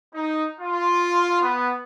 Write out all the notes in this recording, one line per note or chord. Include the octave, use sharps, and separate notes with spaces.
D#4
F4
B3